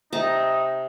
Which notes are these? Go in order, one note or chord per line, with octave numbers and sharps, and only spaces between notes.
C3 D#4 A5 A#5